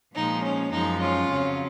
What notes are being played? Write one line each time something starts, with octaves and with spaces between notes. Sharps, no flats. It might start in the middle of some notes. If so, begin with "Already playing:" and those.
A#2 F3 G#3 D#4
C#4
F#2 F3 G#3 D#4
C#4 F4
F2 C#3 F#3